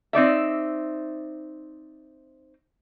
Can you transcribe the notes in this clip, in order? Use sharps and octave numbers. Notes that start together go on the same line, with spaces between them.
C4 D#4 D5 E5